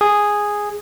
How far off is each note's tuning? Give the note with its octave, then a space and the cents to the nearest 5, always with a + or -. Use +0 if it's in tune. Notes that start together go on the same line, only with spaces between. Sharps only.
G#4 -5